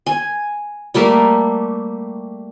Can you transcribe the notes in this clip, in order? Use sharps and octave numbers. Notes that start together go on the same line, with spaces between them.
G#5
G3 A3 A#3